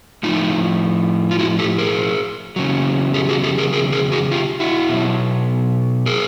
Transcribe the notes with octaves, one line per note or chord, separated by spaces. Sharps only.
A2 F3 D#4 F4
F4
E4 F#4
G4 A4
G#4 A#4
E2 C#3 F#3
G4 A4
F#4 G#4
G4 A4
G#4 A#4
G#4 A#4
G#4 A#4
F#4 G#4
F4 G4
E4 F#4
B2 F#3
G#4 A#4